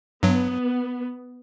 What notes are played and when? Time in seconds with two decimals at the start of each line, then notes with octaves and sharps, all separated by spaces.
0.23 G2 F#3 B3